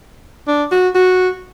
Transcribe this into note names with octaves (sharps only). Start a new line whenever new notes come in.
D4
F#4
F#4